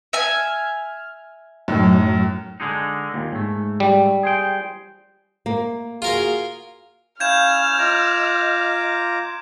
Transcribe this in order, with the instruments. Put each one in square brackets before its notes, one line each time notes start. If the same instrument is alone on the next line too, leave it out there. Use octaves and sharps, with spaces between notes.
[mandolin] E5 G#5 [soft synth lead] F6
[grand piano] F#2 A2 [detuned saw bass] F#3 [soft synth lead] D#4
[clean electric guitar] D3 G#3 D#4
D#2 A#2
G#2 A3
[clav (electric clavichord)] G3
[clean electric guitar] G#4 C5 G5
[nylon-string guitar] A#3
[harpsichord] F4 A#4 F5 [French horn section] F#4 G#4
[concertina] C#4 E4 [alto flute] F5 [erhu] F6 [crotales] G6 G#6 E7
[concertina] F4 A#5 D6 [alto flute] D#5